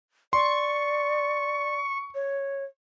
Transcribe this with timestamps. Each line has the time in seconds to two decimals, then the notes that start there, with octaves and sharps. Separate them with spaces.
0.33 D5 C6 C#6
2.15 C#5